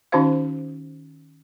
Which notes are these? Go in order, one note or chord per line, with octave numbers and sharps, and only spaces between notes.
D#3 C#4 D#4 F#4 C5 F5